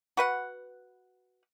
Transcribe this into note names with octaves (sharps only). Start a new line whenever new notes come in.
F#4 B4 F#5